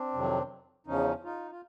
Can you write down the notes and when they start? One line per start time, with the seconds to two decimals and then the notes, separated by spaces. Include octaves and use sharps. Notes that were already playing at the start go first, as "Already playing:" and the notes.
Already playing: C4 D4
0.13 F2 C3 D#3 F#3
0.87 E2 C#3 F3 C#4 D#4
1.24 D#4 F4
1.51 F4